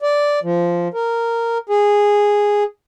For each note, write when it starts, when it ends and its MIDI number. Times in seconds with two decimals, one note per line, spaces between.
0.02 0.39 74
0.43 0.88 53
0.94 1.58 70
1.69 2.64 68